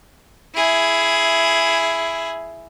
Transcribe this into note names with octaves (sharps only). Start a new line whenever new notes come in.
E4 G#4